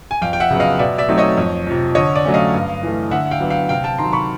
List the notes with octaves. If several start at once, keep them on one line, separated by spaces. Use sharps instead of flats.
G#5
F2 F5 G5
G5
E5 F#5
C#3 F#3 B3
D#5 F5
B2 D5 E5
D5 E5
F#3 A3 C4 D#4
C#5 D#5
F2
C3 F3
D3 C#5 D#5
D5
F#3 A3 C#4
D#5 F5
G2
E3 A3
D3 E5 F#5
F5 G5
F#3 B3 D4
F5 G5
C3 F5 G5
G5 A5
D#3 F#3 A#5 C6
B5 C#6